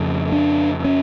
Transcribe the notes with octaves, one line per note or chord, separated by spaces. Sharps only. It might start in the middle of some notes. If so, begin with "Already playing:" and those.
Already playing: F2 C#3
D4
C#4